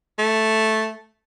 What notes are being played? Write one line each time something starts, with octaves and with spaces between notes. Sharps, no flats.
A3